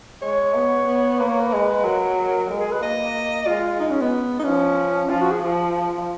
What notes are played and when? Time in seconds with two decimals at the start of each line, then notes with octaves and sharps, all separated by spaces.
0.22 G#3 C#5
0.54 B3
0.87 B3
1.20 A#3 B4
1.30 C#5
1.41 B4
1.52 G#3
1.84 F#3 A#4
2.50 G#3 A#4
2.60 G#4
2.72 B4
2.82 A#3 D#5
3.47 G#3 F4
3.80 D#4
3.91 C#4
4.01 B3
4.40 D#4
4.44 F3 C#4
5.10 F3 F4
5.21 F#4
5.31 G#4
5.43 F3